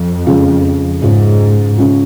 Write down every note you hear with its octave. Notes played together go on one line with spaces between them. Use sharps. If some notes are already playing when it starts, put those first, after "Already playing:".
Already playing: F2
C#3 G#3 C#4 F4
G#2 C#3 G#3 C#4 F4
C#3 G#3 C#4 F4